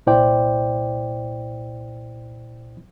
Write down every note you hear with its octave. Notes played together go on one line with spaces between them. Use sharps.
C2 A#2 E4 C5 D5 G5